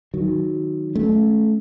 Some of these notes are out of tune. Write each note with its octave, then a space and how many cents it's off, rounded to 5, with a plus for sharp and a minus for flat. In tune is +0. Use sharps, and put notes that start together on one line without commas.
D#3 +0 F#3 +0
A3 -20 C#4 +0